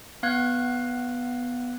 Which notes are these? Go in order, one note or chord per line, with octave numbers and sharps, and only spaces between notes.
B3 F5 F#6 G#6